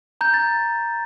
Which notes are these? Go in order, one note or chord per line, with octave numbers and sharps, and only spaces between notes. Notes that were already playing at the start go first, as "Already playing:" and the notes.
A#5 G6
A6